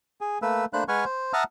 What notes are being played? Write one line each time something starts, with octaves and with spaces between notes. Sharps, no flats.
G#4
A3 A#3 B4 E6
A3 A#3 D4 C5 B5 F#6
G#3 B4 F#5 G#5 C#6 F6
C5
E5 F#5 A5 A#5 D#6 F6